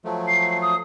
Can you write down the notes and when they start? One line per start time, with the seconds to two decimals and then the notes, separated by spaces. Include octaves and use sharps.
0.05 F3 F#3 A3
0.28 C7
0.62 D#6